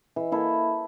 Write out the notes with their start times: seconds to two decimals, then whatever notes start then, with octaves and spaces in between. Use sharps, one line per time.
0.16 E3
0.32 A#3 E4 A4